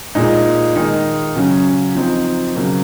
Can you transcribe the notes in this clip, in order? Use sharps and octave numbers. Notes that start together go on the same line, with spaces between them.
A#2 G#3 D#4
D#3 G#3 D#4
C#3 F#3 C#4
F3 C4 D#4
C#3 F#3 A#3